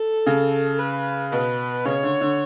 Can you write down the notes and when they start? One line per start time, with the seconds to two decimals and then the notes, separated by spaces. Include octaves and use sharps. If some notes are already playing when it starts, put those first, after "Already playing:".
Already playing: A4
0.26 C#3
0.79 B4
1.32 B2 B4
1.85 C#3 C#5
2.03 D3
2.21 D3